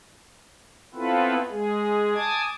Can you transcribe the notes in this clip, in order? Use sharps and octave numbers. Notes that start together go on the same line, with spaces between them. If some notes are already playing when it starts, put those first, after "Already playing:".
B3 C4 E4 F4 A4 B4
G#3 G#4
G#5 A5 D6 D#6 G#6